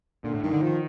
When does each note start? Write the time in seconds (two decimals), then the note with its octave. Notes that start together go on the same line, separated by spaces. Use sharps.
0.24 A#2 D3
0.34 A2
0.43 G2 D#3
0.53 D3
0.62 D#3 F3